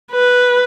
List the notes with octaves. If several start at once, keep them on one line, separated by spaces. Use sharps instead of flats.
B4